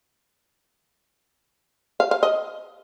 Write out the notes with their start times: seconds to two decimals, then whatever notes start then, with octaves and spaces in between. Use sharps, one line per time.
2.00 F5
2.11 F5
2.23 D#5